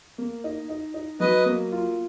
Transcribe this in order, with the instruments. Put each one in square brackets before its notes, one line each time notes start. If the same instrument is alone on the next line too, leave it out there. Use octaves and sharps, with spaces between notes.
[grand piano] A#3
D#4
D#4
D#4
[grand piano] F#3 [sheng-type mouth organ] B4 D#5
[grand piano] A#3
F4